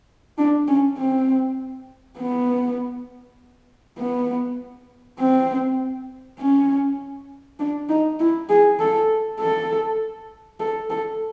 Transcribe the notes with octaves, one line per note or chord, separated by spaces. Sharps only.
D4
C#4
C4
B3
B3
C4
C#4
D4
D#4
E4
G#4
A4
A4
A4
A4